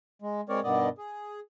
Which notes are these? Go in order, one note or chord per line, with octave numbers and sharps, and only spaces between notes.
G#3
G#3 C4 A#4 C#5 D5
G2 B2 D#3 B3 D5 D#5
G#4